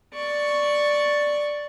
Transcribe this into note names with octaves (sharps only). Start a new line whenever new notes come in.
D5 C#6